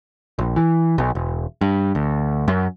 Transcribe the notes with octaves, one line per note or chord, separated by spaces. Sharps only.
A#1
E3
B1
E1
G2
D2
F#2